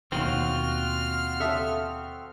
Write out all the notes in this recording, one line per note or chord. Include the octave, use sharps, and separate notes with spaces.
D#2 B2 D#3 C4 F4 F#4 F6
A4 E5 D#6